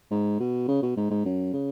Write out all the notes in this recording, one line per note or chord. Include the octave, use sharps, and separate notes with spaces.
G#2
B2
C#3
B2
G#2
G#2
F#2
C#3